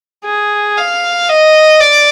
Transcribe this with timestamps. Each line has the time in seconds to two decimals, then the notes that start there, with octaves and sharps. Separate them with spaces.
0.25 G#4
0.77 F5
1.29 D#5
1.81 D5